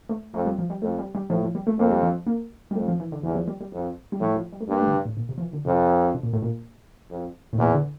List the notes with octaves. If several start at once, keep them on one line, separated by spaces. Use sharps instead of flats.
A3
F2 A3
G3
F3
G3
F2 A3
G3
G3
A2 F3
F3
G3
A3
F2 A#3
G3
F3
A#3
G3
F2 A3
F3
E3
D3
E2 E3
G3
F3
G3
G3
F2
G3
A2 F3
F3
G3
A3
G2 A#3
A3
D3
C3
A2
A#2
C3
F3
E3
D3
F2 C3
C3
A#2
A2
A#2
F2
A2
E2 A#2
D3